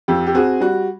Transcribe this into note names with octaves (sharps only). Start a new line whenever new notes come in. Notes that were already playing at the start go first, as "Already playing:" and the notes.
F2 G4
G4
C4 F#4 G#4
G3 F#4